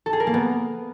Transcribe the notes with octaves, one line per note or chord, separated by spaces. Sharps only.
A4
G#4
A#4
A#3
B3